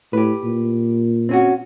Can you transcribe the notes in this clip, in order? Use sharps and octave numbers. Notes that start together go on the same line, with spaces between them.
A2 G4 B4
A#2
C4 C#4 F#4